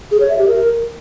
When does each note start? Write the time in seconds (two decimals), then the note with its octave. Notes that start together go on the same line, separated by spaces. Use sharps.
0.11 G#4
0.20 C#5
0.29 E5
0.39 G4
0.48 A#4